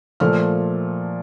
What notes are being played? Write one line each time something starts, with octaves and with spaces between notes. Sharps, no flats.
A#2 F3 A3 F6